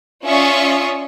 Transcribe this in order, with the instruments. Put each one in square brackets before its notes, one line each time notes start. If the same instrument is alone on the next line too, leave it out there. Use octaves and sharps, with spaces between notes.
[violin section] C#4 F4 D5 E5 C#6 D#6